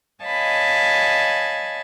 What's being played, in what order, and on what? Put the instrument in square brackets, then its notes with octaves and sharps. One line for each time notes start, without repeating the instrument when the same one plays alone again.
[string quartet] C#5 D#5 F5 G#5 A5 B5